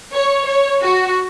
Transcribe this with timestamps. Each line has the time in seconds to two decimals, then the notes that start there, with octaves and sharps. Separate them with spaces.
0.14 C#5
0.47 C#5
0.81 F#4